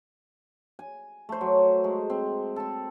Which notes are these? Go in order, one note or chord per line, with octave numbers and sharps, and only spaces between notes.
G#5
A3 C5
F#3
G#3
C4
C4 A4